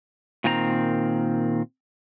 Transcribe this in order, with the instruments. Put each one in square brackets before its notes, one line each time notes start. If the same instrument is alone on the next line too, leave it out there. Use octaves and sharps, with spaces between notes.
[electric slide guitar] A#2 D#3 C4 G#5 A#5